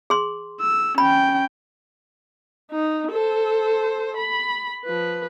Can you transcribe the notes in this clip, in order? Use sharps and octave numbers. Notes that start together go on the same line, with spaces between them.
G#4 C6
E6
C#4 G5 B5
D#4
A4 C5
B5
F3 B4